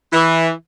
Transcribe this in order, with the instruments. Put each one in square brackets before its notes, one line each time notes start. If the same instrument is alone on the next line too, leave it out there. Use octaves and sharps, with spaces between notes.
[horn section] E3